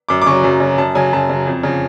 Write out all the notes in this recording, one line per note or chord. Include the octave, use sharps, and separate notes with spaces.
F#2 D6
D6
C#3 F#3 C#6
F#2
C#3 F#3
F#2 A5
C#3 F#3 G#5
F#2 A5
C#3 F#3
F2
C#3 F3